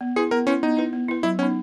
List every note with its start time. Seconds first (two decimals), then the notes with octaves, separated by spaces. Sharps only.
0.01 B3
0.16 E4 G#4 B4
0.31 B3 A#4
0.47 C#4 E4 B4
0.63 B3 D#4
0.77 E4 B4
0.93 B3
1.09 E4 B4
1.23 F#3 E4
1.39 B3 C#4 D#4